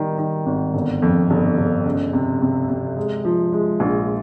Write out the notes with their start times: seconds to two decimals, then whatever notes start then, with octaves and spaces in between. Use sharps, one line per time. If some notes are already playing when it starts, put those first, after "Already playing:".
Already playing: D#3 G3
0.18 D#3
0.46 G#1
0.74 G1
1.02 F2
1.30 G1
1.58 G1
1.85 C#2
2.13 C3
2.41 C3
2.69 C3
2.96 G#3
3.25 F3
3.52 G#3
3.80 A#1